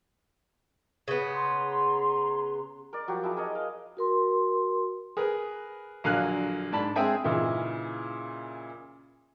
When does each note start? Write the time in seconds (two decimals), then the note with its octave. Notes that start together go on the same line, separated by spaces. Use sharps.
1.08 C#3 B3
1.34 A#5 C6
2.93 A#4 D5
3.08 F3 F#3 F#4 G4
3.24 E4 G#4 A5 A#5
3.36 G#4 A#4 C#5 D#5
3.55 F5
3.97 F#4 A#4 C6
5.17 G#4 A#4 B4
6.04 A#1 D3 F#3 F5 G#5 F#6
6.72 G#2 D4 A5 B5
6.96 G#3 C4 G#4 E5 G5 G#5
7.24 A#2 C#3 E3 D#4 E4